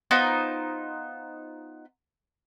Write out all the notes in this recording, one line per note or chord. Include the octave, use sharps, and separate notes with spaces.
B3 D#4 F4 C5